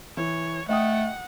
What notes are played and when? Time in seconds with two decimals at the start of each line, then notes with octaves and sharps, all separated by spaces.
0.17 E3 C#5
0.69 A3 D#5 F#5 G5 D#6